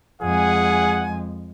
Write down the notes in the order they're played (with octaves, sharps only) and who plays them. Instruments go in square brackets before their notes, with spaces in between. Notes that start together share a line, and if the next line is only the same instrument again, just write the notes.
[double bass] F2 G#3 [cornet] G#4 [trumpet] F#5 [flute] G#5